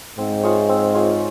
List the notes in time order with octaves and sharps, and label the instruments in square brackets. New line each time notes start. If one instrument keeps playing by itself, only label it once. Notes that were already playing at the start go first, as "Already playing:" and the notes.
[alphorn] G#2 [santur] C4
[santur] F4 G#4 C#5
C4
F4 G#4 C#5